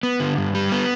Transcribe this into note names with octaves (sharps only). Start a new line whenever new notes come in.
B3
D3
G2
G3
B3